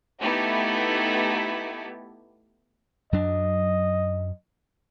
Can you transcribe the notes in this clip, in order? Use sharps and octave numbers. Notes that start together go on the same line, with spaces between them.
A3 B3 D#4 E4 G4
F#2 F#3 D4 D#5